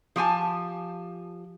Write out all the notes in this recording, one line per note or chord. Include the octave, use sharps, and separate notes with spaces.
F3 G4 G#5 A5